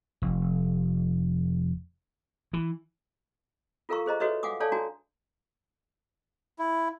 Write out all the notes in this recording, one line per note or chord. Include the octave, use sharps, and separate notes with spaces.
F1
E3
F4 A4 A#4 F5 A#5 C#6
G#4 C5 D#5 A#5
F#4 A4 B4 C#5 D#5 E5
F5 F#5 G#5 D6 D#6
A4 C#5 D5 F5 G#5 A5
D4 F#4 G#5 A#5
E4